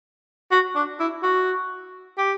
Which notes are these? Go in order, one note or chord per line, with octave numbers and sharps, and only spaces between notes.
F#4
D4
E4
F#4
G4